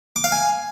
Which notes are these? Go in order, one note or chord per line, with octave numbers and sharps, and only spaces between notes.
D6
F5
G#5